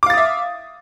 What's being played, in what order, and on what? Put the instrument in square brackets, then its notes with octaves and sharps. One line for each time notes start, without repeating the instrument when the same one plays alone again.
[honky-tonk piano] D6
F5
A6
D#6
E5